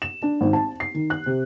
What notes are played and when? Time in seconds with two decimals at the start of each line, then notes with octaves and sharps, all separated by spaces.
0.02 E7
0.23 D4
0.41 G#1
0.53 A5
0.80 C7
0.94 D#3
1.10 F#6
1.26 C3